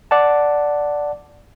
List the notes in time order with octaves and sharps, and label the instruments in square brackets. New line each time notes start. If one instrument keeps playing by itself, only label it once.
[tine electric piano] D5 F#5 A5